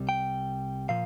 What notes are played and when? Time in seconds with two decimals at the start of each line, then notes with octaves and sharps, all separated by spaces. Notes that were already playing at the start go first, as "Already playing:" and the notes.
Already playing: C2 C3 G3
0.09 G5
0.89 A#2 F3 F5